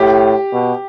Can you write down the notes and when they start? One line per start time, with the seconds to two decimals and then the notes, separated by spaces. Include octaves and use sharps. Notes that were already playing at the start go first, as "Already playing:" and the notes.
Already playing: A2 G4
0.53 B2